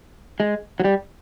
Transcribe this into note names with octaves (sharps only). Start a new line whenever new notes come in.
G#3
F#3
G3